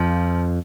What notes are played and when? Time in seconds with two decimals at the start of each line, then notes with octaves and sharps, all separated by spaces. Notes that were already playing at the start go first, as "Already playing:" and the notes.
Already playing: F2 F3